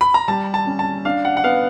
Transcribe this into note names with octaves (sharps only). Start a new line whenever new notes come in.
B5
A#5
G3 A5
A5
C#4
A5
D4 F5
F#5
F#5
B3 F5